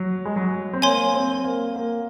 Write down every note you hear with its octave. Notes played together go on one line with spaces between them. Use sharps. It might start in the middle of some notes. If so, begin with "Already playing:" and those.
Already playing: F#3
G#3
F#3
C4
A#3 C#5 G#5 C6
C4
A#3
A#3